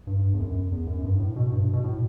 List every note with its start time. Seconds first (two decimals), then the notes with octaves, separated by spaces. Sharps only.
0.07 G2
0.34 E2
0.39 F#2
0.72 E2
0.87 F#2
1.04 G2
1.19 A2
1.36 B2
1.52 G2
1.73 B2
1.84 A2